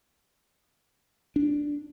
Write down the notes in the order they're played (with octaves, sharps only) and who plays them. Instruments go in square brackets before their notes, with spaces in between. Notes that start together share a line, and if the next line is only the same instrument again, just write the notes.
[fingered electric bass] D4